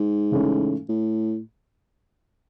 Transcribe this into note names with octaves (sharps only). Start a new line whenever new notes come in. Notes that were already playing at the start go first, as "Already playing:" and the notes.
Already playing: G#2
C#3 E3 A3 C#4
A2